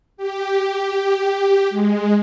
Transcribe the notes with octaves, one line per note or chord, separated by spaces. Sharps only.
G4
G#3